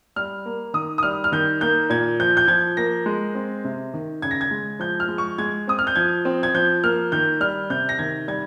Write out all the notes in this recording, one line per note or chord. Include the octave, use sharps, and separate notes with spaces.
G3 F6
A#3
D#3 D#6
D#6
G3 F6
F6
D#3 G6
A#3 G6
A#2 G#6
F3 G6
G6
F3 G#6
A#3 A#6
G#3
C4
C3
D#3
C#3 G#6
A#6
G#6
G#3
F3 G6
F6
G#3
C#6
G#3 G#6
C4 D#6
F6
G6
F3 G#6
C4
G#6
F3 G6
A#3 F6
D#3 G6
G3 F6
C3 G6
A#6
D#3 G#6
G3 G#6